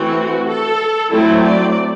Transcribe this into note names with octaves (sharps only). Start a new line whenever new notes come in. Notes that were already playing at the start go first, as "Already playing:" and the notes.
Already playing: E3 A3 C4 F#4
A4
F#3 A3 C4 E4
D5